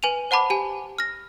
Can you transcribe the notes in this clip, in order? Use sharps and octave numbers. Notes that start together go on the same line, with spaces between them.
B4 G#5 D#7 F7
C5 F#5 A5 B5 D6
G4 G#5
F6 A#6